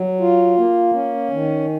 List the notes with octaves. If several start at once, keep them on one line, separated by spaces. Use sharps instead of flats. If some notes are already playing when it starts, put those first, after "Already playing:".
Already playing: F#3
F4
A#3
C#4
D#3